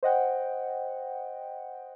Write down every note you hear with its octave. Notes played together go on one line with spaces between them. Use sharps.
C5 D#5 F#5 G5